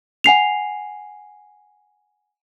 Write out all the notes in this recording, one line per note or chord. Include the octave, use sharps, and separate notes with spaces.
F#5 G#5 C7 F7